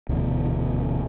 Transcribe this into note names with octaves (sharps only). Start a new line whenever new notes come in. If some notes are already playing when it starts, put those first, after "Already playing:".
D#1 D2 B2 E3